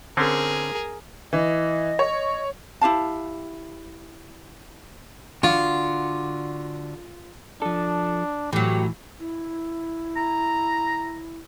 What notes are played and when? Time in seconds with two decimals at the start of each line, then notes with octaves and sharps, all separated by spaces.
0.17 D3 C4 C#4 G#4 A#4
1.33 E3 D#5
1.99 C#5
2.81 E4 G4 F5 A5
5.43 D3 D4 F4 F#4
7.62 F3 D4 A4
8.53 A2 E3 F#3 G4
9.20 E4
10.16 A#5